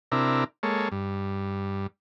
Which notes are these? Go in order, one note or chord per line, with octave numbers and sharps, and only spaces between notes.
C3 D4 E4 A#4
G#3 A#3 A4 C#5
G2